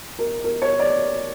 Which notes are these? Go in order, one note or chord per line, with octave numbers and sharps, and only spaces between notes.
A#4
A#4
C#5
D5